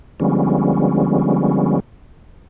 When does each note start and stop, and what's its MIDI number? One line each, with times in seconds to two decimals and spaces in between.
0.20 1.80 50
0.20 1.80 53
0.20 1.80 55
0.20 1.80 56
0.20 1.80 59
0.20 1.80 61